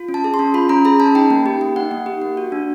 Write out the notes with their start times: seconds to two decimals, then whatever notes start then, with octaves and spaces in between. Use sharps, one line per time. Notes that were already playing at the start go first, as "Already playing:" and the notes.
Already playing: F4
0.09 C#4
0.14 A5
0.24 G#4
0.34 C6
0.39 C#4
0.54 F4 B5
0.69 C#4 A#5
0.85 G#4 B5
1.00 C#4 A5
1.15 D#4 G5
1.30 A#3
1.46 G4
1.61 A#3
1.76 D#4 F#5
1.91 A#3
2.06 G4
2.22 A#3
2.37 F#4
2.52 D4